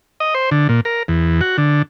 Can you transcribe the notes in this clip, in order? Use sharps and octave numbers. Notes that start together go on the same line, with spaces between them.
D#5
C5
D3
A#2
A#4
E2
F#4
D3